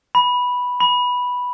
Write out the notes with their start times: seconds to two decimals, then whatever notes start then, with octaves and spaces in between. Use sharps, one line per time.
0.15 B5
0.80 B5